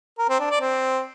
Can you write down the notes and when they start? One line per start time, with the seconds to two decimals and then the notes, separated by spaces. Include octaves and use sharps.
0.18 A#4
0.29 C4
0.40 D4
0.50 D5
0.61 C4